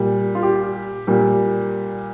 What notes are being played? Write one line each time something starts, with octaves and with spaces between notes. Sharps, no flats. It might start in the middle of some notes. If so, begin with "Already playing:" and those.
Already playing: A#2 G3
F4
G4
A#2 G3